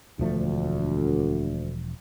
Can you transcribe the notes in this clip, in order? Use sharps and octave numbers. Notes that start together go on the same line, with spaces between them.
E1 D2 F3 A3